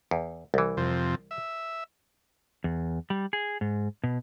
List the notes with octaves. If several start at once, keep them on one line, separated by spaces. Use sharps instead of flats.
E2
C2 E3
F2 C3
E5
E2
G3
G#4
G#2
B2